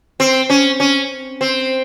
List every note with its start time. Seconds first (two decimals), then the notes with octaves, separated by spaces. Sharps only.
0.20 C4
0.50 C#4
0.80 C#4
1.41 C4